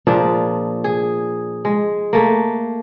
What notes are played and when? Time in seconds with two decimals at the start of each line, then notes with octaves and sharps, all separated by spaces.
0.07 A#2 F3 D4 G#4
0.84 G#4
1.65 G#3
2.13 A3 A#3